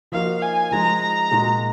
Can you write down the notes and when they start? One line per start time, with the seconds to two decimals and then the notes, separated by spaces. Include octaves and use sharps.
0.12 F3 A#3 D#4 F#4 F5
0.43 G#5
0.72 F3 G#3 D#4 A#5
1.02 A#5
1.31 A#2 G#3 D#4 F#4